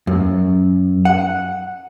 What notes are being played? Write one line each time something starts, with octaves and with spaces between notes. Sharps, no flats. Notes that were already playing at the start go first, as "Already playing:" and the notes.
F#2
F#5